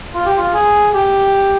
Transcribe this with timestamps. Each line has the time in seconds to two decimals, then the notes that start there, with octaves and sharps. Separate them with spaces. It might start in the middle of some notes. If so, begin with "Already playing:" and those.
0.14 F4
0.26 G4
0.37 F4
0.54 G#4
0.94 G4